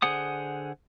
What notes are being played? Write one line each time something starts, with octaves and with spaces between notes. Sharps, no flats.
D3 G#4 C5 F#5 D#6